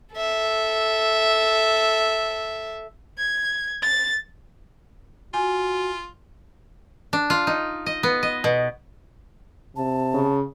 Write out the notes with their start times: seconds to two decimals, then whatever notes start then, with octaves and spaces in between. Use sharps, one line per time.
0.14 A4 E5
3.18 G#6
3.82 A6
5.34 F4 F#4 G#5
7.13 D4
7.30 F4
7.47 D#4
7.86 D#5
8.03 B3
8.23 D#5
8.44 B2
9.76 C3 A5
10.14 C#3